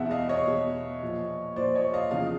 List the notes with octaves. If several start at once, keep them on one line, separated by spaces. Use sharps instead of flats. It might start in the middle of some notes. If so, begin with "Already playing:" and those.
Already playing: E2 B2 E5 F#5
D#5 F5
C#5 D#5
E2 B2
A#2 F3
A#2 F3 C5 D5
C#5 D#5
D#5 F5
E2 C#3 F3 D#5 F5